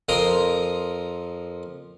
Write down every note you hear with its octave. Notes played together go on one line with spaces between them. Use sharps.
F2 F3 A#4 A#5 C6 D#6